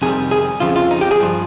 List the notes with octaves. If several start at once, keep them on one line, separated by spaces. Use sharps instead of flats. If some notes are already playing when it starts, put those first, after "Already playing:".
F2 C3 D#3 G3 G#4
G#4
F2 C#3 F3 F4
F4
D#4
G4
G#4
G2 F3